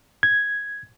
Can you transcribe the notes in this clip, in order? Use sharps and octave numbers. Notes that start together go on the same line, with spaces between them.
G#6